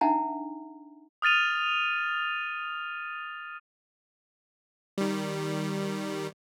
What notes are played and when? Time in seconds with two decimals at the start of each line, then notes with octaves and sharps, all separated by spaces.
0.01 D4 D#4 E5 F#5 G#5 A#5
1.22 D#6 F6 A6 D#7 F7
4.98 D#3 G3